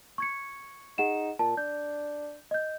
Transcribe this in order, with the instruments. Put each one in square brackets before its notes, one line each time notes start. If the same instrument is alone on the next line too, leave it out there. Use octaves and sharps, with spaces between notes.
[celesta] C#6 G#6 C#7
[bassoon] D#4 [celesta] G#4 F#5 E7
[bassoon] A#2 [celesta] A5
[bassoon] D4 [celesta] G6
[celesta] D#5 G6